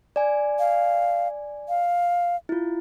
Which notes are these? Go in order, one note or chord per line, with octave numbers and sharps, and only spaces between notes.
D5 G#5
F5
F5
E4 F4